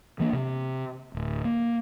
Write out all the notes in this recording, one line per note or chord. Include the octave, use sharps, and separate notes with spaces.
E3 A#3 D4
C3
D1
A#3